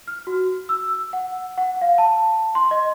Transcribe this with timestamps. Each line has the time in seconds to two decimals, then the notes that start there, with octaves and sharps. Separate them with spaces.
0.08 F6
0.27 F#4
0.69 E6
1.13 F#5
1.58 F#5
1.81 F5
1.98 A5
2.55 C6
2.71 D#5